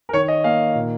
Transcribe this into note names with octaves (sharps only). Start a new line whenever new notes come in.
A#4
D#3 C#5
D#5
A#3 F5
A#2